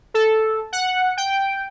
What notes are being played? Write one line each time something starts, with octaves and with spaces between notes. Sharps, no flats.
A4
F#5
G5